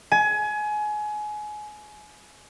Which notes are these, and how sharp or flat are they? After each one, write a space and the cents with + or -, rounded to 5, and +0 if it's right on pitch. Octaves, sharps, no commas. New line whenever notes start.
G#5 +25